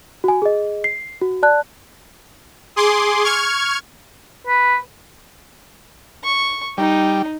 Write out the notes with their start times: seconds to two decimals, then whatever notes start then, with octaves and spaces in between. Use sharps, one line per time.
0.24 F#4 G#5
0.42 G#4 D#5
0.84 C7
1.22 F#4
1.43 D5 A5 F#6
2.76 G#4 C6 D6
3.24 C#6 F6 G#6
4.47 B4
6.24 C#6
6.78 G3 D#4